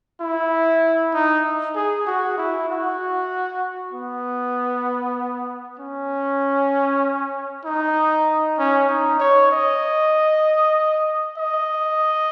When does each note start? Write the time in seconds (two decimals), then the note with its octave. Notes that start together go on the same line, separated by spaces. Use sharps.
0.20 E4
1.14 D#4
1.75 G#4
2.07 F#4
2.38 E4
2.69 F#4
3.93 B3
5.79 C#4
7.65 D#4
8.58 C#4
8.89 D#4
9.20 C#5
9.51 D#5
11.38 D#5